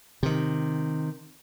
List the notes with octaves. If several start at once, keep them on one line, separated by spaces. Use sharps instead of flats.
C3 D#3